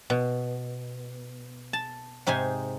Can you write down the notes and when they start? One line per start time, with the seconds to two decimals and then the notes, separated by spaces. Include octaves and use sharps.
0.10 B2
1.73 A5
2.27 G#2 C3 D#4 C5 G#5